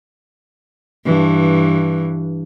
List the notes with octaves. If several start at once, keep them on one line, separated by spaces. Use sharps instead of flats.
G2 E3